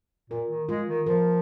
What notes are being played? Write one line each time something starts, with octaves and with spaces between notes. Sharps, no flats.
A#2 A#4
D#3
G#3 F4
D#3
F3 A#4